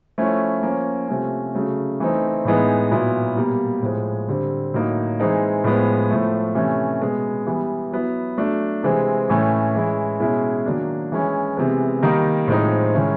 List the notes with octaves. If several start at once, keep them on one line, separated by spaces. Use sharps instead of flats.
F3 A3 C#4 E4
F3 A#3 C#4
C3 F3 A3 C#4
C#3 F#3 A3
E3 A3 C4 D#4
A2 E3 G#3 B3 D#4
A#2 F#3 B3 E4
B2 G3 A#3
A2 F3 G#3
D3 G3 C4
A2 F#3 A#3 D#4
E3 G#3 C4 D#4
A2 F3 G#3 B3
A2 F3 A3
C3 E3 A3 C#4
B2 G#3 B3
E3 G3 B3
F#3 B3 E4
F#3 A3 D4
C3 E3 G#3 C4
A2 E3 A3 C#4
E3 G#3 C#4 E4
B2 G#3 C#4 E4
D#3 F#3 A#3 D4
E3 G#3 C#4 E4
C3 E3 G#3 B3
D#3 G3 A#3 D#4
A2 F3 G#3 C4 D#4
D#3 G#3 C#4 E4